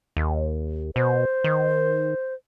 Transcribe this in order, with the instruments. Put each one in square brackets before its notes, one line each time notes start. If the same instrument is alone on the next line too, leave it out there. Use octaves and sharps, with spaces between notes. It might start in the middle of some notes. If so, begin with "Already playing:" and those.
[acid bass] D#2
[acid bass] B2 [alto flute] C5
[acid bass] D#3